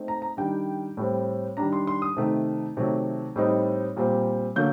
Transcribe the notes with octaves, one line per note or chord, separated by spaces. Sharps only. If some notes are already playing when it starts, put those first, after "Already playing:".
Already playing: A3 C4 D#4
A#5
A#5
D#3 G3 D4 G5
A2 G3 C4
D#3 G3 D4 A#5
C6
C6
D#6
C3 D#3 A3
C3 D#3 F#3 A3
A2 G3 C4 D#4
A#2 G3 C4
D3 F#3 A#3 G6